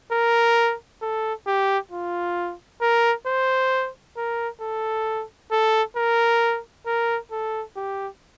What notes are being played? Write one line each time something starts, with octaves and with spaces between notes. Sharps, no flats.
A#4
A4
G4
F4
A#4
C5
A#4
A4
A4
A#4
A#4
A4
G4